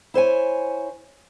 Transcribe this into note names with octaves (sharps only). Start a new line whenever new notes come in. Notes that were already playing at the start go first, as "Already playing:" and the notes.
E4 C5 C#5 G#5